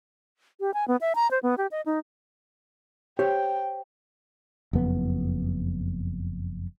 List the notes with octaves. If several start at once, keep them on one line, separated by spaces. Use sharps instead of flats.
G4
G#5
B3
E5
A#5
C5
B3
G4
D#5
D#4
G4 C5 C#5 G5
F#1 F2 B3